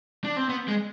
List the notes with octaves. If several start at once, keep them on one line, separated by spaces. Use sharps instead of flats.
D4
C4
B3
G#3